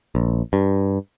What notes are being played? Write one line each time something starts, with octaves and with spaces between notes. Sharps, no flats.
A#1
G2